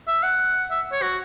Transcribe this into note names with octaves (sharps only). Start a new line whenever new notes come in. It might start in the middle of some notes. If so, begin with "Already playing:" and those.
E5
F#5
E5
C#5
F#4